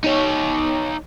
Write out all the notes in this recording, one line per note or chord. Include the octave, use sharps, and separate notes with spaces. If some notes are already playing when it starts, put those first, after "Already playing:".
D#4 C#5